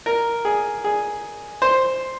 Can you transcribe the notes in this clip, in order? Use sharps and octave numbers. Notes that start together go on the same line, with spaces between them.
A#4
G#4
G#4
C5